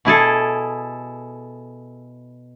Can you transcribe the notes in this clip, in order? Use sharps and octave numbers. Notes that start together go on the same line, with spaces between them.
B2 E4 G#4 A4